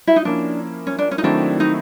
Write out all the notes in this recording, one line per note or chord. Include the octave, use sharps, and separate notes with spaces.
E4
D#4
F3 A#3 C#4 D4 E4
C#4
D4
C#4
D#4
D#3 F#3 A3 C4 D4 E4
D#4